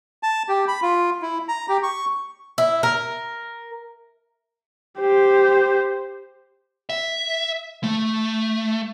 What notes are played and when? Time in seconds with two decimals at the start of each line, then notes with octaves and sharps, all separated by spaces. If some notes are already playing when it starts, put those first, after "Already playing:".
0.23 A5
0.48 G4
0.68 B5
0.82 F4
1.22 E4
1.48 A#5
1.69 G4
1.83 C#6
2.58 E4
2.83 A#4
4.99 G4 C5
6.89 E5
7.84 A3